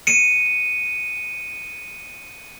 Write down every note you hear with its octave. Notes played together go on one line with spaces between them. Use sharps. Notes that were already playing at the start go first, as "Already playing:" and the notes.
C#7 D#7